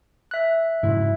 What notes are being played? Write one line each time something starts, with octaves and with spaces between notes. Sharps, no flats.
E5 F#6
G#2 C#3 F#3 E4